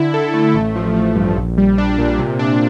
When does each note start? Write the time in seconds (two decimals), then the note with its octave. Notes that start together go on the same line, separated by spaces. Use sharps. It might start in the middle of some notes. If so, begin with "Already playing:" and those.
Already playing: D3 E4
0.14 A4
0.34 A3
0.54 A1
0.76 F3
0.96 A3
1.16 G2
1.37 A#1
1.58 G3
1.78 D4
1.98 A#2
2.19 C3
2.39 D4